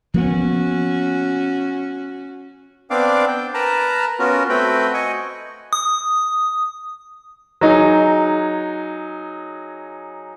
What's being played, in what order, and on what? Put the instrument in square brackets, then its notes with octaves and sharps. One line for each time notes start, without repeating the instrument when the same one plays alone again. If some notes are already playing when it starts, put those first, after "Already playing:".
[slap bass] F3 A#3 B3 [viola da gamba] C#4 F#4
[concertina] B3 C4 D4 D5 F5 D6
G5
A#4 B4 A5 A#5
B3 C#4 F4 F#4 A#4
A3 C4 F#4 B4 G5
D#5 G#5 C#6
[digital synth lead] D#6
[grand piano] F#3 D#4 G#4